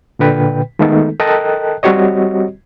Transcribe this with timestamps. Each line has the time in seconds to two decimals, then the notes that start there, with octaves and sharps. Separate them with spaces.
0.19 A#2 D3 B4 G5
0.79 D#3 G#3 A3 B3 D#4 A4
1.20 A4 A#4 D#5 G5 A5 F#6
1.83 G3 C4 F#4 G4 C#5 D#5